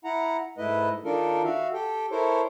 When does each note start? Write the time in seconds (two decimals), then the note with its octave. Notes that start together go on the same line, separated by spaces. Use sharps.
0.05 E4 F#5 A#5
0.58 G#2 A3 E4 B4 D#5
1.05 D#3 D4 F4 A4 A#4
1.44 F#4 E5 F5
1.73 G4 A4 G5
2.12 E4 A4 A#4 C5 C#5